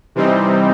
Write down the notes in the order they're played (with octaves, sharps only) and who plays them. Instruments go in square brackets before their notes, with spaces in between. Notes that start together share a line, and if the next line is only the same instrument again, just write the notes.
[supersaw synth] C3 E3 G3 C4 D#4